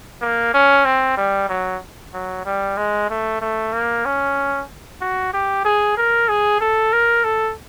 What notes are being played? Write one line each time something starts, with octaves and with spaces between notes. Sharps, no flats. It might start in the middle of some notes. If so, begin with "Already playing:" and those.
A#3
C#4
C4
G3
F#3
F#3
G3
G#3
A3
A3
A#3
C#4
F#4
G4
G#4
A#4
G#4
A4
A#4
A4